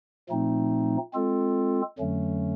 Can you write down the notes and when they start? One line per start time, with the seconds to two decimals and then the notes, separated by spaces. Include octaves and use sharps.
0.29 A#2 F3 A3 C4 D#4
1.14 G#3 C4 F4 A4
1.99 F2 D3 F#3 A3 C#4